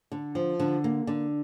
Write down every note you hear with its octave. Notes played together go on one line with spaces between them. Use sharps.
D3
F3
D3
A#3
D3